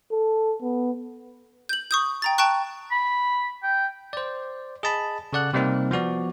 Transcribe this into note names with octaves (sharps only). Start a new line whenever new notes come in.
A4
B3
G6 F#7
C#6 D#6 G6
G5 A#5 A6
G5 A5 A#5 C#6 F#6
B5
G5
C5 D5
G#4 D#5 A5 B5
C#3 A4 D5 F#5 F#6
C3 G3 A#3 C4 D#4 A#4
F3 B3 F#4 D5